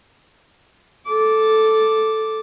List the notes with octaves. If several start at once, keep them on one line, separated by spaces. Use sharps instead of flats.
A4 D6